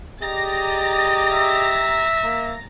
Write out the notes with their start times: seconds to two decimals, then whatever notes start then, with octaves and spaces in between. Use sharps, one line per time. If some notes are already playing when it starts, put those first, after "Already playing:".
0.22 G4 G#4 D5 D#5 A#5 A6 A#6
1.32 E5
2.23 A#3